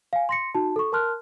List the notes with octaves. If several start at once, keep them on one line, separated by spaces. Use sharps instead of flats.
F5 G#5
C6 A#6 C#7
D#4 F#4 A5
A4 C#6
A#4 A5 C6 F6 F#6